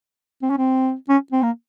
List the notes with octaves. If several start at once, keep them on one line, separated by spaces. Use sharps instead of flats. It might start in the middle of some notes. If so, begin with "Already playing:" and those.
C4
C#4
C4
C#4
C4
A#3